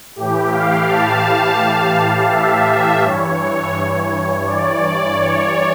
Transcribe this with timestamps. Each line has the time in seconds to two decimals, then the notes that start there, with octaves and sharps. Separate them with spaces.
0.16 A2 E3 G4
0.51 F5
0.87 A5
1.22 F5
2.30 E5
3.02 G2 E3 C#5
4.45 D5
5.17 C#5